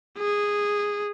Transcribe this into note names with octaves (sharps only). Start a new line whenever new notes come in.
G#4